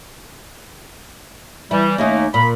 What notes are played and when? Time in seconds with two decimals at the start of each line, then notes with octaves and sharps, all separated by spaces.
1.71 E3 G3 E4
1.98 D#2 A3 A#3 C#4 D#4
2.34 A#2 B5